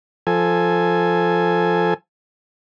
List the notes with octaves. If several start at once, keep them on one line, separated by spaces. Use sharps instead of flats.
F3 A4 G#5